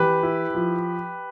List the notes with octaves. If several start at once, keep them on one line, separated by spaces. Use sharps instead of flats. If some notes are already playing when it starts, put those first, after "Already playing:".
Already playing: E3 G4 B4
E4
F3